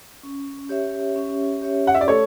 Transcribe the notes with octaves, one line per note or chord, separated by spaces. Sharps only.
C#4
G4 C#5 E5
C#4
G4 C#5 E5
F#5
E5
D5
A3 A4 C#5